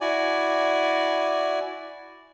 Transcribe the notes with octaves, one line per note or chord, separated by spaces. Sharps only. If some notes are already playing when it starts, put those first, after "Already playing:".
E4 F#4 D5 G#5